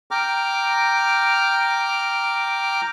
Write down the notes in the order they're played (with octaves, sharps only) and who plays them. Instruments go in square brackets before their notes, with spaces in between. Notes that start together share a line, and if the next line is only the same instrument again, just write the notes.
[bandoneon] G5 A#5 D6 F6